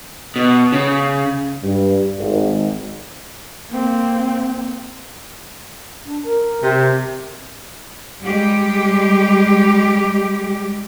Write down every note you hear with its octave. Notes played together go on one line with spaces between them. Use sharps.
B2
C#3
G2
G#1
A#3 C4
D4
A#4
C3
G3 G#3 G4